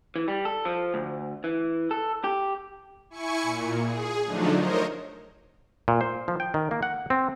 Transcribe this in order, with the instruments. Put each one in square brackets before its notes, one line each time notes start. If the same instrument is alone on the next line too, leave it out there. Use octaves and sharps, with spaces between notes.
[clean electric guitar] E3
G3
A4
F3
D2
E3
A4
G4
[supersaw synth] E4 G#5 C#6 C#7
A#2
G#4
D3 F3 F#3 A3 D4 D#4
A#4 C5 C#5 D#5
[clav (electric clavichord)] A#2
C5
F3
G5
D#3
A#3
F#5
C4